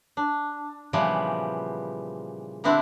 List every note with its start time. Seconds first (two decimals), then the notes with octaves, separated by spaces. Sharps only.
0.17 D4
0.93 A#2 C#3 E3 F3 G3 B3
2.64 D3 G3 B3 C4 D4 E4